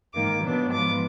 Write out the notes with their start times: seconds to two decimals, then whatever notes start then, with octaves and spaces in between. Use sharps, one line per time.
0.14 G#2 D#3 A#3 D6
0.42 B2 F#3 B3 D4
0.70 G#2 F3 B3 D6